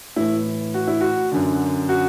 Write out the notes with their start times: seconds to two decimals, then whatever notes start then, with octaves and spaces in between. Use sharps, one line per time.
0.16 A2 E3 E4
0.74 F#4
0.87 E4
1.01 F#4
1.31 F#2 D3
1.89 F#4